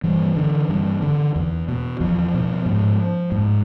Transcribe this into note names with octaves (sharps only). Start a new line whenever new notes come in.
G2 E3
D3
G2
D3
E2
B2
E2 F3
B2
G#2
G#2